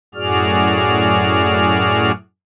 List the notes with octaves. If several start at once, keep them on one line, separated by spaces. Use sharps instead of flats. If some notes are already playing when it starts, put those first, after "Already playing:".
F#2 A2 F#4 G#4 D5 F6